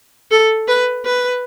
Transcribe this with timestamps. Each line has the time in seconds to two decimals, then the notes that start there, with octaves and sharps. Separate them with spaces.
0.31 A4
0.68 B4
1.05 B4